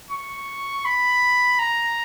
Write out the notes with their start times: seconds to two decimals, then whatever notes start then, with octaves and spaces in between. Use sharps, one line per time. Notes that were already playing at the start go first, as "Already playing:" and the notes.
0.10 C#6
0.85 B5
1.59 A#5